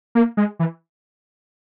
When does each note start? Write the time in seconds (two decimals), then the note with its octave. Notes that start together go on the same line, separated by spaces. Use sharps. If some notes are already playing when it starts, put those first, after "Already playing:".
0.15 A#3
0.37 G#3
0.59 E3